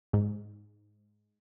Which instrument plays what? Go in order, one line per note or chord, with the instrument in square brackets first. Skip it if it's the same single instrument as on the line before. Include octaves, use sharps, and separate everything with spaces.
[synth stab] G#2